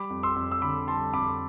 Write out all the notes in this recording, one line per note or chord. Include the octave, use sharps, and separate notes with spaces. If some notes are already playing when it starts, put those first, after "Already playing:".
Already playing: G3 B5 D6
F2
C6 E6
F2
E6
D3 B5 D6
G3 A5 C6
F2 B5 D6